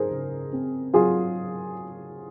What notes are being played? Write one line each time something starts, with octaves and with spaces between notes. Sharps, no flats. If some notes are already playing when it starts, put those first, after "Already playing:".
Already playing: F#3 D#4 G#4 A#4 C5
C#3
C4
F#3 F4 G#4